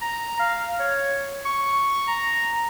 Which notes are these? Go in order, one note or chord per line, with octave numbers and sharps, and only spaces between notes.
A#5
F5
C#5
C#6
A#5